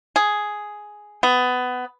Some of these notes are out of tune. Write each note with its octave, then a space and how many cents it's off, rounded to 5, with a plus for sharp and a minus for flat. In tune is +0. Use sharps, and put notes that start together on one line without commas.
G#4 +5
B3 +20